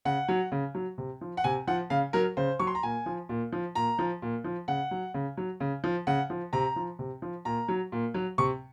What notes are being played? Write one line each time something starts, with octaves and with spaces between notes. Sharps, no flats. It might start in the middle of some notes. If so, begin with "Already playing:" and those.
C#3 F#5
F#3
C#3
F#3
C3
F3
F#5
C3 G#5
F3 F#5
C#3 F5
F#3 A#4
C#3 C5
F#3 C#6
C6
A#5
A#2 G#5
F3
A#2
F3
A#2 A#5
F3
A#2
F3
C#3 F#5
F#3
C#3
F#3
C#3
F3
C#3 F#5
F3
C3 A#5
F3
C3
F3
A#2 A#5
F#3
A#2
F#3
C3 C#6